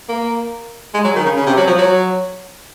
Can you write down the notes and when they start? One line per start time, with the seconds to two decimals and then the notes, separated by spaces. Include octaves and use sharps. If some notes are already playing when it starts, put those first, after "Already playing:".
0.09 A#3
0.94 G#3
1.04 F#3
1.15 D#3
1.25 C#3
1.37 C#3
1.46 C3
1.57 F#3
1.67 F3
1.78 F#3